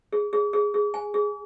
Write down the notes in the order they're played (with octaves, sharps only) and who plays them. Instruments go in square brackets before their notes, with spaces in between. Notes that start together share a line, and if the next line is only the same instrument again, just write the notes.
[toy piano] G#4
G#4
G#4
G#4
G#5
G#4